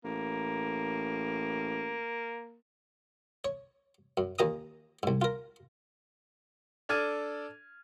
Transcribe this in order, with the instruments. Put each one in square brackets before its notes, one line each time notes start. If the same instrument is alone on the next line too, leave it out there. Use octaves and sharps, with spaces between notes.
[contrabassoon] A1 [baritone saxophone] A#3
[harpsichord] C#5
F#2
D#2 A#2 A#5 D#6
C2 G#2
F4 A#4
[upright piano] D4 A4 D5 F6 G#6 D#7